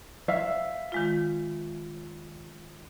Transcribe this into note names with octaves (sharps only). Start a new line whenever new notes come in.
E5 F5
D#3 G#3 F4